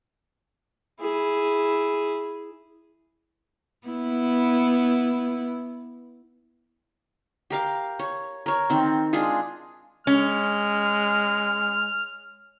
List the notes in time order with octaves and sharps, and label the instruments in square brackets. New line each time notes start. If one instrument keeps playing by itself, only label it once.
[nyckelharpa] E4 G#4
[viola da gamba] B3 E4
[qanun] G4 A#4 F5
C#5
A#4 C#5
D#3 C4
G#3 D4 F4 G#4
[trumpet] G#3 [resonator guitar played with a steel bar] C#4 [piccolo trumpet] F6